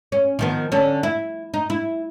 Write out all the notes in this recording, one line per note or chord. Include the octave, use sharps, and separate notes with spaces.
C#4
D#3 F3 B3
D3 C#4 A4
E4
D#4
E4